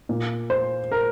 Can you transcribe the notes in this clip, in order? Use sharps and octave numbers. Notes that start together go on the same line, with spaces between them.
A#2
C5
A#4